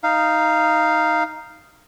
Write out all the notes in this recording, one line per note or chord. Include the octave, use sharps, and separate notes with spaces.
D#4 F5